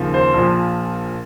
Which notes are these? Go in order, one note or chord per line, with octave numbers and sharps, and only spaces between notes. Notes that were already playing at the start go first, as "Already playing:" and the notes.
Already playing: D#2 C#3 F3
C5
A#1 A#2 F3